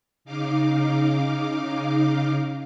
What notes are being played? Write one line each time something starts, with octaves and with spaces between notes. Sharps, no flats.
C#3 D#4 F5 D6